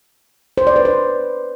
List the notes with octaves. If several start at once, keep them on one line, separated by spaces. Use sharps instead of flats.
C5
D5
B4
C5